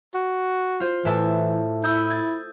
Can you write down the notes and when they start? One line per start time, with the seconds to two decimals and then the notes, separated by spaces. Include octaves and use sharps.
0.15 F#4
0.80 F4 C5
1.05 A2 E3 E5 A5
1.84 E4 D#6 E6 G6
2.10 G#6 A6